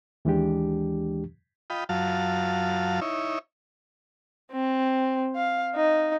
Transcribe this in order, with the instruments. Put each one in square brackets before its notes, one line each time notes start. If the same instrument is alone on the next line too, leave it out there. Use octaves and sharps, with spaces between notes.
[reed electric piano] D#2 E3 G#3 D4 G4
[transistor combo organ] F4 D#5 G5 B5
F#2 F#3 F4 F5 A5
D#4 E4 C#5
[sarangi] C4
F5
D#4